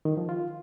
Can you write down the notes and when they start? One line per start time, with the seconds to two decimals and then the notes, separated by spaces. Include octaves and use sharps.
0.05 D#3
0.17 F3
0.29 F4